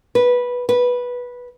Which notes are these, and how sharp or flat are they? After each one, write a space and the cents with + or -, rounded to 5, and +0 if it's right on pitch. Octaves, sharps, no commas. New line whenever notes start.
B4 -10
B4 -10